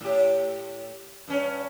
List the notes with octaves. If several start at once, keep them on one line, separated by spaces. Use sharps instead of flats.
A2 G4
G2 C#4